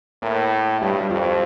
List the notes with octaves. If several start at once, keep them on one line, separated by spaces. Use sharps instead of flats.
A2 A#3
G2 G3
G3
F2 F3
F3